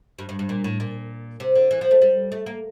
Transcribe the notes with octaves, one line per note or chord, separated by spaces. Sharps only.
G2
G2
G2
A#2
A2
A#2
C3
D3
E3
F3
A3
G3
A3
A#3